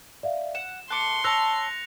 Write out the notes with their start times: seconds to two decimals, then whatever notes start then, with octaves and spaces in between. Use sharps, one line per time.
0.23 D5 E5 F5
0.55 F#5 E7
0.90 A3 C6 D6 F#6 C#7
1.24 C#5 A5 E6 F#6 A#6 F7